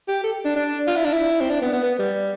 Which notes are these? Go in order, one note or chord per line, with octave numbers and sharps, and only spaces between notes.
G4
A4
D4
D4
F4
E4
D4
E4
C4
D4
B3
B3
B3
G3